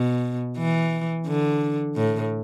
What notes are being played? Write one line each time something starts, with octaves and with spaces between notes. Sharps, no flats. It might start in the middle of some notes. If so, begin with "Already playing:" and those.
Already playing: B2
E3
D3
A2